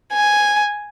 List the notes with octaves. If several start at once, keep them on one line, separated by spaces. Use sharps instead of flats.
G#5